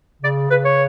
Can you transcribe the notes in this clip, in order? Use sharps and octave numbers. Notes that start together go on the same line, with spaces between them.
C#3 D5
C#3 B4
C#5